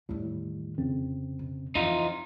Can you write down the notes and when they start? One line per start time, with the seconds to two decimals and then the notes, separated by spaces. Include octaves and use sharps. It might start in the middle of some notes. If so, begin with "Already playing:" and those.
0.09 E2 A2 D#3 G3
0.78 F2 C#3 C4
1.39 B2
1.75 F2 E3 D#4 F4